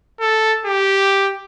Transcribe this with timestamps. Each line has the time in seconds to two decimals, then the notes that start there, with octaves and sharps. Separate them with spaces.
0.20 A4
0.66 G4